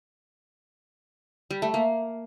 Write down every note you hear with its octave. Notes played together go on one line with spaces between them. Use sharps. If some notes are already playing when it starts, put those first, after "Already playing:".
G3
A3
A#3